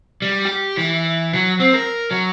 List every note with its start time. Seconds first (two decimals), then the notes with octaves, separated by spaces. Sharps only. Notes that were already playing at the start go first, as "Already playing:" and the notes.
0.22 G3
0.45 G4
0.77 E3
1.34 F#3
1.60 C4
1.73 A#4
2.11 F#3